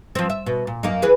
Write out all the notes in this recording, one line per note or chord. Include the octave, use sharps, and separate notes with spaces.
F3 C4
E5
B2
A#2
F#2 A#3 D#4
E3 G#4 B4